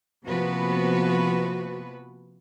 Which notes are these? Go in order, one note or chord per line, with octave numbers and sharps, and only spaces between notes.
C3 F3 A#3 B3 F#4 B4